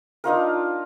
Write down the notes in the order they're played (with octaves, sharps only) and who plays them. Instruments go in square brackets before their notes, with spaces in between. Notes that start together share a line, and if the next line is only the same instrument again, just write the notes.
[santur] D4 D#4 F4 A#4